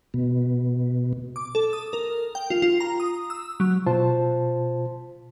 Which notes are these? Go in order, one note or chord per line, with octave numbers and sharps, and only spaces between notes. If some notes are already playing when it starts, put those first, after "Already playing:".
B2
D6
A4
D#6
A#4
G5
F4
F4
A#5
D#6
E6
F#3
B2 F4 C5 A5